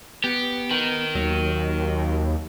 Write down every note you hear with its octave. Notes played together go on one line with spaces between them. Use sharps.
B3 G4
D#3
D#2 F#3